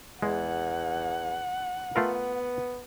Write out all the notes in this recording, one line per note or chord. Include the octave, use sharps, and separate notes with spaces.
E2 G#3 F#5
A3 B3 F4 A#4